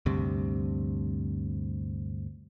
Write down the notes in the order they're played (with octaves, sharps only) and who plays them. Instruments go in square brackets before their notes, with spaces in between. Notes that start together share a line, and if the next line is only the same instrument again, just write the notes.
[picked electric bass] D2 G2 C3